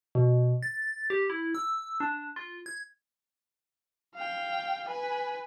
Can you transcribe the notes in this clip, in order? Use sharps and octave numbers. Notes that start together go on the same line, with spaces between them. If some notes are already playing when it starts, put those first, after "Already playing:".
B2
A6
G4
E4
E6
D4
F4
G#6
F5 G5
B4 G#5